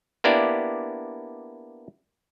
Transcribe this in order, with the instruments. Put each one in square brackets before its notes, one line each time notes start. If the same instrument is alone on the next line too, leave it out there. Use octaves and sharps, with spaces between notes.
[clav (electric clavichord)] A#3 B3 D4 E4 G4 D5